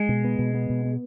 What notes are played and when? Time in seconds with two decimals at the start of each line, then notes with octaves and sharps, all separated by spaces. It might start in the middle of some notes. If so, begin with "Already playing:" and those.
Already playing: G#3
0.09 B2
0.24 B3
0.39 B2
0.54 B3
0.70 B2
0.85 B3